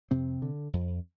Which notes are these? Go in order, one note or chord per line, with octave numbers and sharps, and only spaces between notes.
F2 C3 C4
D3
F2